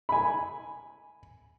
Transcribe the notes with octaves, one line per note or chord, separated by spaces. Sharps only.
G#5 B5